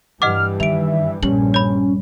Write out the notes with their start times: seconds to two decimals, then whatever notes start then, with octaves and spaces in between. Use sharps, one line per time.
0.22 G2 E3 G3 D#5 F#5 D6 F6
0.60 D#3 E5 D7 F7
1.23 A#1 G2 A#2 G3 C#4 F#7
1.54 C#5 B5